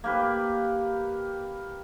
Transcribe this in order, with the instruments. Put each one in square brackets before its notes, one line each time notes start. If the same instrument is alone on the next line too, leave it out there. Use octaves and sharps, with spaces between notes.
[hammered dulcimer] A#3 G4 B4